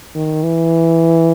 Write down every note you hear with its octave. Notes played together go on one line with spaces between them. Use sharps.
D#3
E3